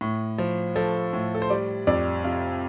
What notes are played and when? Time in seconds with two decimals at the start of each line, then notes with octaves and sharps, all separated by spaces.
0.01 A2
0.38 F3
0.76 F3 A4
1.13 A2
1.35 A4
1.42 C5
1.50 G3 D5
1.87 F2 D5
2.24 C3 F4